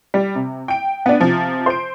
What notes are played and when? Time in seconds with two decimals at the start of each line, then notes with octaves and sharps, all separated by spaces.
0.14 G3
0.35 C3
0.68 G5 D7
1.06 B3 D4
1.20 C3 F3
1.66 C5 D7